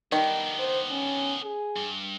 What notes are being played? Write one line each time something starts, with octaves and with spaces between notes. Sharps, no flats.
D#3 G3 B3 D4
C5
C#4
G#4
G2